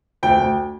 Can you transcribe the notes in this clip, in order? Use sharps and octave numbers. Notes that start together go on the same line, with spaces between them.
D2 G5
D2